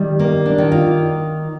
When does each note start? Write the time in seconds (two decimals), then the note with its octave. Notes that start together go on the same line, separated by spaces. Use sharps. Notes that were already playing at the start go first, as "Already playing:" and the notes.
Already playing: D#3 G3
0.19 A#3
0.46 D4
0.58 D#3
0.72 F4